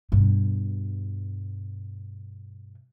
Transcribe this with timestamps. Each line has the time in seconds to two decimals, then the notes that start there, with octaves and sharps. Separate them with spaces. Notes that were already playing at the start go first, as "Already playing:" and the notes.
0.12 G2 B2